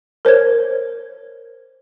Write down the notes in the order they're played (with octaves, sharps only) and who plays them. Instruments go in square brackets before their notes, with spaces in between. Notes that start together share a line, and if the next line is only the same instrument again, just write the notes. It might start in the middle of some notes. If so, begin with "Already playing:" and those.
[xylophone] A#4 C5 C#5 G#6